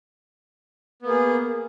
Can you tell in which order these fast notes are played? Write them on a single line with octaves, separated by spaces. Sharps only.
B3 A#3 G#4